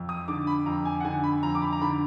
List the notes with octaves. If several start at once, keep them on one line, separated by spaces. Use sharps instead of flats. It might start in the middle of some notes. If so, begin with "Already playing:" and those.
Already playing: F2
D#6
D3 D6
B5
F2 A#5
G#5
F#5
D3 G#5
B5
F2 A#5
D6
B5
A#5
D3 B5